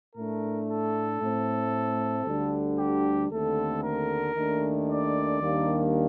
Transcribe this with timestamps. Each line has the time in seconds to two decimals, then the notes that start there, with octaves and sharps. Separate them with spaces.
0.15 A2 A3 D4 A#4
0.68 A4
1.20 A2 A3 C4
2.26 D2 D3 G3 D4
2.78 G4
3.30 D#2 D3 A3 C4 A4
3.83 A#4
4.35 D#2 D#3 A3 D4
4.88 D5
5.41 D#2 D#3 G3 A#3 D4